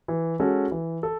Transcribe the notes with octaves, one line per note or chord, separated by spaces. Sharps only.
E3
G#3 C#4 F#4 A4
E3
A4